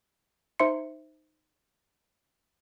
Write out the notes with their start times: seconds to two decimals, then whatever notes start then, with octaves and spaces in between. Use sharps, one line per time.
0.59 D#4 C5 E5 C6 C#7